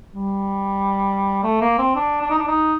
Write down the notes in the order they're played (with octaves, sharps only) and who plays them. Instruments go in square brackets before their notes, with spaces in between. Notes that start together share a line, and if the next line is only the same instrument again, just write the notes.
[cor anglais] G3
A3
A#3
C4
D4
D4
D#4
D4
D#4